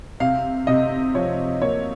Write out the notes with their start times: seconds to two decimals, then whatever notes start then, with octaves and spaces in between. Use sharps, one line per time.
0.20 C3 F5
0.67 C3 D#5
1.15 F3 C#5
1.62 A#3 C#5